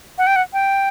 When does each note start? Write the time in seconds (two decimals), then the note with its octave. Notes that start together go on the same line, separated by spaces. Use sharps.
0.18 F#5
0.27 G5
0.36 F#5
0.53 G5